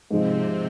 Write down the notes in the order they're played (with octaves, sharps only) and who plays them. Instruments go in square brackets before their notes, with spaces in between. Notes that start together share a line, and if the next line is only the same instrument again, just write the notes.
[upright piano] G#2 F3 G#3 [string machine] C3 C4